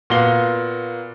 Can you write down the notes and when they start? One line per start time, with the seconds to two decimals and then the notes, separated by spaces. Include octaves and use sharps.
0.10 A#2 B3 F#4 F5 G7